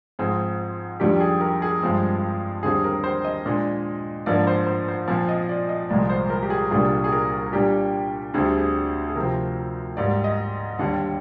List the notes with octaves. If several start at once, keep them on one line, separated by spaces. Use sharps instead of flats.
G#2 F3 C4 G#4
F2 D#3 G3 D4 G4
G#4
A#4
G#4
G2 F3 G#3 C4
D#2 D3 G3 C4 G#4
A#4
C5
D#5
A#2 G#3 D4
G#2 F3 A#3 D4 D5
C5
C5
C5
A#2 F3 C4
D#5
D5
D#5
C2 A#2 F3 G#3 D5
C5
A#4
G4
G#4
C2 A#2 G3 A#3 D4 G#4
G#4
A#4
A#2 G3 D4 G4
D2 D3 G3 C4 G#4
G4
G#4
G#4
D2 C3 F3 C4 A#4
G#2 G3 A#3 D5
D#5
D#2 D3 G3 D4